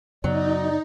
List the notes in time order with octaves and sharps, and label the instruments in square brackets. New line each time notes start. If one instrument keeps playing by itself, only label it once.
[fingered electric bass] F#2 C#3 B3 [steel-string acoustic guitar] F#3 [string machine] D#4 [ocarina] D5